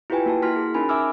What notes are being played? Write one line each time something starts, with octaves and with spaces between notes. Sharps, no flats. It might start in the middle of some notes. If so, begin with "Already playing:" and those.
E4 F4 G4 B4 G5 G#5
A#3 F#4 A5
A#3 E4 F#4 C6 F6 B6
G#4
C#4 D#4 A#4 G#5 B5
E5 G#5 D6 E6 F6